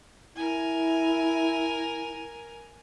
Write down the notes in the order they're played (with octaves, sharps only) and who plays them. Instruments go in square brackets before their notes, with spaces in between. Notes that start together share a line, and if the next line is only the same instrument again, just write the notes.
[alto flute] E4 [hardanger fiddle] A#4 G#5